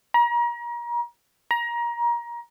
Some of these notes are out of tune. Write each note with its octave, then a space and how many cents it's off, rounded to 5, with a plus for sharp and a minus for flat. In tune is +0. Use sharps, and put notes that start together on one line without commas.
A#5 +35
A#5 +25